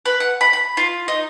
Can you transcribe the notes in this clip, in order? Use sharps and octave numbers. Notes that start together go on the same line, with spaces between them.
B4
F#5
B5
B5
F4
D#4